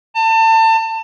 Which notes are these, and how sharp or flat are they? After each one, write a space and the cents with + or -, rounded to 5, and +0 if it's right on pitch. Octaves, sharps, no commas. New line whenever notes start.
A5 +30